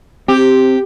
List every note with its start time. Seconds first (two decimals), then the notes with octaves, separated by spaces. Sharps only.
0.28 C4 G4